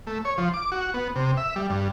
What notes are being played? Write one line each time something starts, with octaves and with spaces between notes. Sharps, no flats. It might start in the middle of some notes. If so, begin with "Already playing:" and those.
A3
C#5
F3
D6
F#4
B3
C3
E5
G3
G2